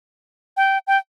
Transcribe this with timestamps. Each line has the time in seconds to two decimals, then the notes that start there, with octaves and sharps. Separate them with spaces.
0.57 G5
0.87 G5